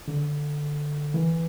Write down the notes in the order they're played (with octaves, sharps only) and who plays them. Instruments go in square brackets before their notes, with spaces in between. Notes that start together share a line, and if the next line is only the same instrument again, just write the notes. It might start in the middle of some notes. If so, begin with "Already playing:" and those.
[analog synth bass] D3
E3